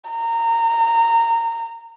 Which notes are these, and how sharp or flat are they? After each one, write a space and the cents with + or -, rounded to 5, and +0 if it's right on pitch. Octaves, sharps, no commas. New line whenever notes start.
A#5 -20